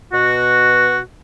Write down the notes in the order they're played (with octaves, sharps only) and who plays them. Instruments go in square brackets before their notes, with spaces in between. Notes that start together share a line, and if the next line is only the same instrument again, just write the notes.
[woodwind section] B2 F#4